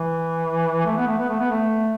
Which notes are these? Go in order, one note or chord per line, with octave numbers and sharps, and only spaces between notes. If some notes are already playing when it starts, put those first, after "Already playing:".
Already playing: E3
A3
B3
A3
B3
A3
B3
A3